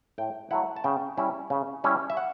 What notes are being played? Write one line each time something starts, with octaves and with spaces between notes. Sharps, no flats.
A2 G5
F#3 A3 E4 F#5
A5
C#3 G5
G3 C#4 E4
C#3
G3 C#4 E4
E5
F#5